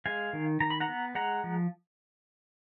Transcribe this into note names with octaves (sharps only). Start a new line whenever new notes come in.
G#3 F5 G#5
D#3
D#3 A#5
B5
F#5 A#5
B3
G#3 F#5 A#5
F3